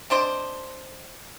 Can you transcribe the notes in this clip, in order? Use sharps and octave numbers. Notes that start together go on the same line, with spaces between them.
C4 D4 C5 D#5